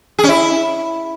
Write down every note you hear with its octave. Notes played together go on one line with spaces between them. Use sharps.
G#4
C#4
E4